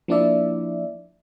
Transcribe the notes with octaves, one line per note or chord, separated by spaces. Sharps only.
F3 A#3 D4 E4 D5 E5